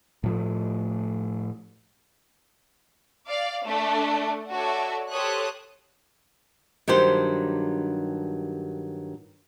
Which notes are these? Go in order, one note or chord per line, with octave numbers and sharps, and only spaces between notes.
A2 F3 A3
D5 F5
A3 D4
F#4 A4 C#5 D5 E5
G4 A4 C5 C#5 D#6 F#6
G2 D#3 F#3 G4 C5